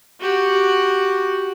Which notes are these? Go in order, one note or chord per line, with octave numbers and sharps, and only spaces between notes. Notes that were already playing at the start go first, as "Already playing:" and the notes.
F#4 G4